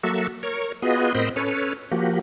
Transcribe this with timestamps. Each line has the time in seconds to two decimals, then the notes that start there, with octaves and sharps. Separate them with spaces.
0.03 F#3 A#3 F#4 A4 E5
0.43 A#4 C#5 C#6
0.82 B3 F4 F#4 G#4 B4 D#5
1.15 A2 C4 A#4 C5 D#5 B5
1.36 C#4 A4 B4 C#5
1.91 F3 A#3 F#4 G4